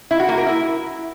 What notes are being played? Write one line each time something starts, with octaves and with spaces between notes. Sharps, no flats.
E4
F#4
A#3
A#4
E4